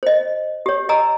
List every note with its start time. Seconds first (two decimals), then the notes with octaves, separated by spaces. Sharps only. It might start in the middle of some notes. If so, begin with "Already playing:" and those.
0.03 C5 D#5
0.66 G4 C#5
0.89 D#5 G#5 A#5 E6